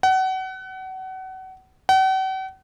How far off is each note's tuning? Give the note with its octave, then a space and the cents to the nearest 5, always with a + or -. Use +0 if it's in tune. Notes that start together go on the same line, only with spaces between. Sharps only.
F#5 +30
F#5 +45